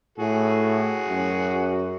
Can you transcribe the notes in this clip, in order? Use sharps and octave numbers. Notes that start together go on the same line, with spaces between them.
A2 F#4 G#4
F#2